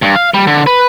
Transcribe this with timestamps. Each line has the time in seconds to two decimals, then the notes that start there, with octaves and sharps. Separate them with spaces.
0.02 G2
0.16 F5
0.34 G3
0.47 D3
0.67 B4